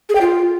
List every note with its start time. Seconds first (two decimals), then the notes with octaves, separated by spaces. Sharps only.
0.09 G#4
0.15 G5
0.21 F4